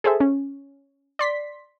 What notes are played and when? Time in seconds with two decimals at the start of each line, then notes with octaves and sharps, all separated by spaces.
0.04 G#4 A4 C5 E5
0.20 C#4
1.19 D5 C6 B6